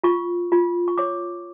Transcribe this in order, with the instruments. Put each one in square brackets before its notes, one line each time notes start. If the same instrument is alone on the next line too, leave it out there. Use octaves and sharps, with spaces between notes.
[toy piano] F4 C#6
F4
C#6
C#5 D6